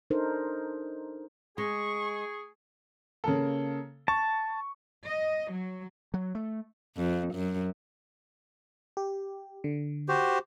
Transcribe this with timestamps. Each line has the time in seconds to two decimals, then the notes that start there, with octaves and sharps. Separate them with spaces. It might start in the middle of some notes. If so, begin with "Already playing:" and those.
0.10 D4 D#4 A4 A#4 C5
1.58 G#3 G#4 C#6
3.24 C#3 A#3 A4
4.08 A5 C#6
5.05 D#5
5.51 F#3
6.14 F#3
6.35 A3
6.97 F2
7.35 F#2
8.97 G4
9.64 D3
10.09 F#4 G4 C5